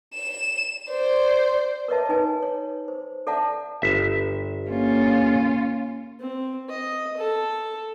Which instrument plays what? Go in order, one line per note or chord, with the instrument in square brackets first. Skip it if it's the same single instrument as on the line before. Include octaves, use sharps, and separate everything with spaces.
[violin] E7
C5 D5
[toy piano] A#4 B4 C#5 D#5 E5 A5
D#4 B4 G#5
C#5
C5
A4 D5 E5 F#5 A5
[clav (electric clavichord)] G1 E5
[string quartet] A#3 C#4 F4
[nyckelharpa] C4
D#5
A4